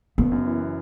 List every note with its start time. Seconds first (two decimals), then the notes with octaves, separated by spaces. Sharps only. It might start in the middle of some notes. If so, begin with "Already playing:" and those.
0.18 F#1 B3
0.32 F#2
0.46 E3